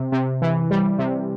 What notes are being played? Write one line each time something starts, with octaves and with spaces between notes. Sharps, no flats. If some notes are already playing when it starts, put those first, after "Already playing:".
Already playing: C3
C3
E3
G3
C3